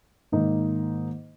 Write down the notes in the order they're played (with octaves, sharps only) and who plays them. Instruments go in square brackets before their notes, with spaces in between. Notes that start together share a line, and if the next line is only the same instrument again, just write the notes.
[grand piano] G#2 D#3 A#3 D#4